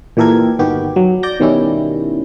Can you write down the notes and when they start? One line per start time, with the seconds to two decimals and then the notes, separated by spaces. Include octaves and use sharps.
0.17 A#2 E3 G4 A4 A#4 G#6
0.59 G1 D#3 B3 F#4 G4
0.96 F#3
1.23 D5 G6 A#6
1.40 B2 D#3 G3 C#4 E4